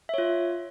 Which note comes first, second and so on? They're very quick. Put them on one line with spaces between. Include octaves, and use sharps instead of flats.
E5 C#5 F4